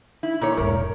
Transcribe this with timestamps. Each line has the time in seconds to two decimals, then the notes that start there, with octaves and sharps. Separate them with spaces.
0.23 E4
0.41 A#2 C#5
0.57 E1 G#2 A#4